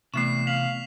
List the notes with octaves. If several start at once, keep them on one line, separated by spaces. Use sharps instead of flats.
C3 E3 A3 B3 C#6 C7 E7
F5 B6 F7 F#7